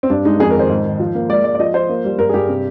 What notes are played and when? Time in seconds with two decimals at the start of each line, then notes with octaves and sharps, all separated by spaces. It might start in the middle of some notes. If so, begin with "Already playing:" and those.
0.03 C4
0.10 G2 D4
0.25 G#3 D#4
0.40 F2 G#4
0.50 A#4
0.55 D#3 C5
0.69 G#2
0.85 D#3
1.00 F3
1.15 A#3
1.29 G#3 D5
1.44 G#3 D5
1.55 D5
1.59 F3 D#5
1.74 F3 C5
1.89 A#3
2.05 G3
2.19 G2 A#4
2.29 G#4
2.34 G2 G4
2.49 C3